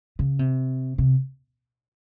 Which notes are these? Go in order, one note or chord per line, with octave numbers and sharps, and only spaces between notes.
C#3
C3
C3